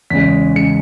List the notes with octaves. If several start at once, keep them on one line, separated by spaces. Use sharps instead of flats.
E2 C#3 G#3 B6
C#3 G#3 C#7